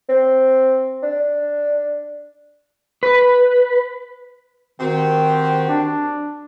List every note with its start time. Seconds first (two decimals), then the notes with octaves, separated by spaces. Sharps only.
0.09 C4
1.03 D4
3.03 B4
4.80 D#3 C4 F#4 G4
5.69 D4